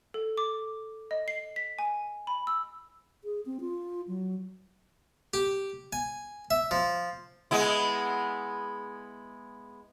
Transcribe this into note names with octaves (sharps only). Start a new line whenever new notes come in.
A4
D6
D#5
C7
B6
G#5
B5
E6
G#4
C4
F4
F#3
G4
G#5
E5
F3
G#3 B3 E4